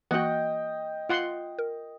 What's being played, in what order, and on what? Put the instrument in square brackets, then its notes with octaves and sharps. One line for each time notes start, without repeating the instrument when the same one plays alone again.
[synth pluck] E3 A#3 [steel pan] F#4 F#5 [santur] D#5 G5
[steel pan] F4 F#5 C6
[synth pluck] A#4